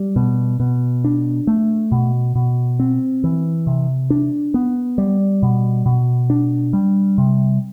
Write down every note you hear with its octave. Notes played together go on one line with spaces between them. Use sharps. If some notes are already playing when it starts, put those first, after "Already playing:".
Already playing: G3
B2
B2
D4
A3
B2
B2
C4
E3
C3
D4
B3
G3
B2
B2
D4
G3
C3